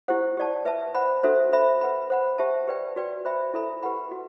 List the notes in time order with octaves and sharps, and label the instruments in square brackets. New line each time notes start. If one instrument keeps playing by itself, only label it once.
[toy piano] E4 G4 C5 F#5
G4 D5 A5
B4 E5 A5
C5 F#5 B5
D4 F#4 A4 C5 E5
C5 E5 B5
B4 F#5 B5
C5 F#5 B5
G4 C5 E5 A5
G4 B4 D5 G5
F#4 B4 D5 G5
C5 E5 G5 B5
E4 A4 E5 B5
G4 B4 F#5 B5
F#4